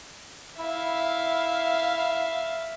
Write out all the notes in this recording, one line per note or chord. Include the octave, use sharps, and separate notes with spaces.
E4 E5 F5